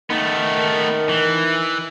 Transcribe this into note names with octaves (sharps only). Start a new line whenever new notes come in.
D#3 A3 B3 A#4
E3